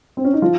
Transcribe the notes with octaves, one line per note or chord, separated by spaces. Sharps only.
C4
C#4
D#4
F3 F4